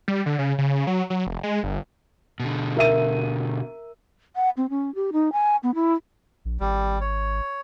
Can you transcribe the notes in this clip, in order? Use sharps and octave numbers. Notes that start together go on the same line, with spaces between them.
G3
D3
C#3
C#3
F#3
F#3
F1
G#3
G1
B2 D3
A#4 E5 D#7
F#5
C4
C#4
G4
D#4
G#5
B3
E4
A#1
G#1 G3
C#5